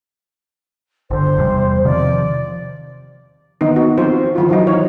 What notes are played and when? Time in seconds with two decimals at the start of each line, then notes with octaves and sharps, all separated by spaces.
1.11 G1 D3 C5
1.38 E2 C3 G3
1.85 C3 D#3 F3 D5
3.61 D#3 B3 D#4
3.76 F#4
3.98 F3 C4 F4 C5
4.36 E3 F3 F4
4.49 D#3 E3 F#3 D#4
4.67 C#5